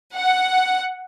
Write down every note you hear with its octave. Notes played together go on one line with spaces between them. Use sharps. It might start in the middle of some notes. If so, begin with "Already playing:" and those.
F#5